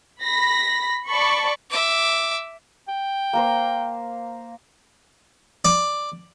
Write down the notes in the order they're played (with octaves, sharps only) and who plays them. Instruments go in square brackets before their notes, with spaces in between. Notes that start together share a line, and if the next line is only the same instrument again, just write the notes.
[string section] B5 A#6 B6
D5 A5 B5 C#6
[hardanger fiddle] E5 D6
[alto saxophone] G5
[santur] A#3 A#4 C5
[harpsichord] D5